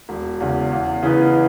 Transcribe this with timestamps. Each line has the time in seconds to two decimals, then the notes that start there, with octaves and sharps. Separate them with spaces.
0.09 E1
0.40 E2 C#3
0.71 E2
1.03 C#3 E3 B3 D#4